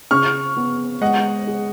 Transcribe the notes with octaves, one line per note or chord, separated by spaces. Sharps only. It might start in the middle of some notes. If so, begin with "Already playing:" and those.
C#3 C#6 F6
B3
G#3 D#5 F#5
G#4